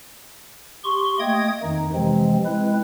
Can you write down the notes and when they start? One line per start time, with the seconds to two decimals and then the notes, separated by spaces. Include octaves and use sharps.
0.84 G4 C6 C#6
1.20 A3 A#3 D#5 G5 D#6 G#6
1.63 F2 D#3 D#4
1.94 C3 E3 F3 G#3 C4
2.45 G#3 C4 E4 B4